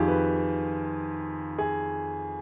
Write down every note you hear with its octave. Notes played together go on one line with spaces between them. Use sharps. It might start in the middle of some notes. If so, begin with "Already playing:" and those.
Already playing: F2 D#3 F4 G4 G#4
B4
G#4